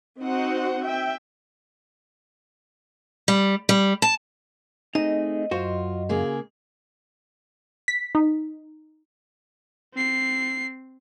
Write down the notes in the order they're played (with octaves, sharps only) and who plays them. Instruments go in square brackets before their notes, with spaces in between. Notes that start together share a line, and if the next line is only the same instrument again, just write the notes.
[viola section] C4 D#4 F#4 C5 F#5
E5 G5
[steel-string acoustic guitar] G3
G3
A5
[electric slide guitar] A3 C4 G#4 [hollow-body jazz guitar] D#4 [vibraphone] D#5
[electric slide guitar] F#2 [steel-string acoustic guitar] F4 [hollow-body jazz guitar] F#4 C5
[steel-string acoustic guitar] C#3 A#3 G#4
[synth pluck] B6
D#4
[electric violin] C4 C7